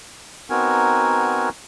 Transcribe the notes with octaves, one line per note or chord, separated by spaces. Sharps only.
B3 C4 D#4 F#4 A#4 G#5